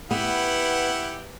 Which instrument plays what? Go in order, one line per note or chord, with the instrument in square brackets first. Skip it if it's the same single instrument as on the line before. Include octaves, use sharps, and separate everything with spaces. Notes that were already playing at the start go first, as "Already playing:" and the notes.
[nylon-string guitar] B3 [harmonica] E4 G4 F#5